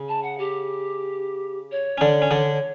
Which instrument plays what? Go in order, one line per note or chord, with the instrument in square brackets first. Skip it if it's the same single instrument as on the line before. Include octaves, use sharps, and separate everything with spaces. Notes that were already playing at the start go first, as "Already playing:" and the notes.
Already playing: [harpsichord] C#3
[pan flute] A5
F#5
G4
C#5
[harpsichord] C#4
D3 D4
C#4
D3 D4